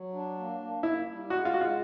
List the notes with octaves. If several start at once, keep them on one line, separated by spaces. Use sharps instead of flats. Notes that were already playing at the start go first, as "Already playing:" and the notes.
Already playing: F#3
D4
A#3
A#3
A#3 E4
G3
G#3 F#4
F4
G#3 F#4
F4